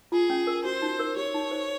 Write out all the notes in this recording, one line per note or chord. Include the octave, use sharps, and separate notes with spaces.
F4 G#4
C#4
A#4
F#4 C5
D#4
A#4
G4 C#5
D#4
C5